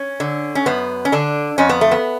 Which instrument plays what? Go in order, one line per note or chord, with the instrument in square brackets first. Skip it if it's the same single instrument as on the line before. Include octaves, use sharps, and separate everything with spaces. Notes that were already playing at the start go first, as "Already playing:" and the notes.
Already playing: [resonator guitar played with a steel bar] C#4
D3
C#4
F#2 B3
C#4
D3 D4
F2 C#4
B3
A3
B3